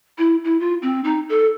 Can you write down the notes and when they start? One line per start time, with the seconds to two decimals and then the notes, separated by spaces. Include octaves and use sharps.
0.18 E4
0.44 E4
0.60 F4
0.82 C4
1.04 D#4
1.29 A4